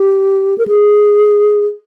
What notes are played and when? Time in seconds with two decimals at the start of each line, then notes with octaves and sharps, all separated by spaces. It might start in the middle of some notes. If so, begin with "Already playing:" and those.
Already playing: G4
0.58 A#4
0.68 G#4